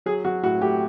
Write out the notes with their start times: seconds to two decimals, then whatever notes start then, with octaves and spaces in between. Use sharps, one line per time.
0.06 F#3 G#4
0.25 F#3 F#4
0.43 A2 F#4
0.62 A2 G4